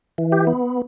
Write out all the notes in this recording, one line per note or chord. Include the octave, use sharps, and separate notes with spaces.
E3
G4
B3